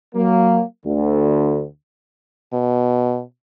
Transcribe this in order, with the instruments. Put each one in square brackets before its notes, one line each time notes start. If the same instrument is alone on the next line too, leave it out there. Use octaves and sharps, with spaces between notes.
[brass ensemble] F#3 A#3
D2 D3
[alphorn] B2